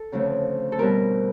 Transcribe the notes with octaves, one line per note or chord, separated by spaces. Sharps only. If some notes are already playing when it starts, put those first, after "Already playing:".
Already playing: A4
D2 C#3 F3 A3 C4
A4
B2 G3 C4 A#4